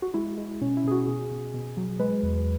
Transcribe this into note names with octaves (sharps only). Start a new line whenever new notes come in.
F#4
G#3 E4
G#3
B2 C#4
E4
B2 G#4
F#4
B2 G#4
B2
B2
F#3
G#3 B4
E2